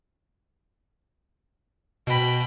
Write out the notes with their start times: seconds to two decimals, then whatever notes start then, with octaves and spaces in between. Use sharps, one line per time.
2.07 B2 G5 B5